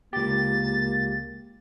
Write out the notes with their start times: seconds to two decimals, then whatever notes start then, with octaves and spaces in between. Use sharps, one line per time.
0.13 C#2 A#3 G4 A6